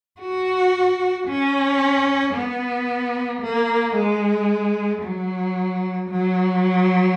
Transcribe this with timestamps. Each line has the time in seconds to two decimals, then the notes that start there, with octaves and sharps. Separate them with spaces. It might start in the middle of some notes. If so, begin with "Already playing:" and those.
0.20 F#4
1.27 C#4
2.34 B3
3.42 A#3
3.95 G#3
5.02 F#3
6.09 F#3